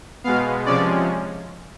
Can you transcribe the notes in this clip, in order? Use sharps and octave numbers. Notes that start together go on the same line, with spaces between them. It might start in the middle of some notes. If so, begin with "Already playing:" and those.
B2 G#3 B3 F5
C3 F3 G#3 C#4 D5